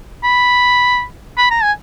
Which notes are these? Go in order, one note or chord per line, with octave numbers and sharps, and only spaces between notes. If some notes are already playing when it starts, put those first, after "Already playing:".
B5
B5
A#5
G#5